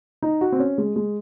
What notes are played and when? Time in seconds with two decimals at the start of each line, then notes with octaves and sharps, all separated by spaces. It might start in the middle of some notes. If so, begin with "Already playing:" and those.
0.22 D#4
0.41 F#4
0.52 C4
0.59 C#4
0.78 G#3
0.96 G#3